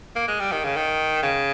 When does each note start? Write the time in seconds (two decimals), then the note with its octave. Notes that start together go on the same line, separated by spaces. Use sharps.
0.16 A#3
0.28 G#3
0.40 G3
0.52 D#3
0.64 C#3
0.76 D#3
1.23 C#3